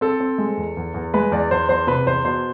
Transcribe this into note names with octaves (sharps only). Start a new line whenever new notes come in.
C4 A4
C4
G#3
E2
E2
E2
G#3 B4
E2 D5
E2 C5
E2 C5
C3 B4
E2 C5
B2 C5